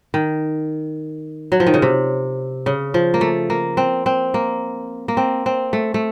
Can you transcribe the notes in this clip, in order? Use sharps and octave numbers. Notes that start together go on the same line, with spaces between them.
D#3
F#3
F3
D#3
C#3
C3
C#3
F3
A#3
A3
A#3
C4
C4
A#3
A#3
C4
C4
A3
A3